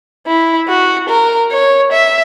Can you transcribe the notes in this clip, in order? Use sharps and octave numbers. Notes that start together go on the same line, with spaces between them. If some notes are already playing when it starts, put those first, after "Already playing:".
E4
F#4
A#4
C#5
E5